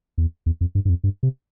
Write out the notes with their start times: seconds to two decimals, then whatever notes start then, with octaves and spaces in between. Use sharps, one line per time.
0.18 E2
0.46 E2
0.61 F2
0.75 G2
0.85 G2
0.89 F2
1.04 G2
1.23 C3